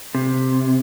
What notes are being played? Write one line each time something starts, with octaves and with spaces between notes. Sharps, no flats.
C3